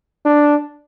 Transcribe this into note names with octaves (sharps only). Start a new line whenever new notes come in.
D4